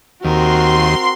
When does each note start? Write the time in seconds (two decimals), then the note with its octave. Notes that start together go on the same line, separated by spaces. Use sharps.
0.24 D#2 C4 F#4 A#4 C6